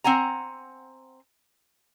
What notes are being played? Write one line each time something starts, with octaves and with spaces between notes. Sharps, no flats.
C4 F#5 G#5 A#5